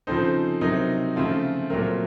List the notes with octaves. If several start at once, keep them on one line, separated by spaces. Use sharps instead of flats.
C#3 F3 C4 D#4 A4 C5
C3 F#3 C4 D#4 A#4
C#3 F3 A3 C4 F4 A4
A#2 F#3 A3 C4 A#4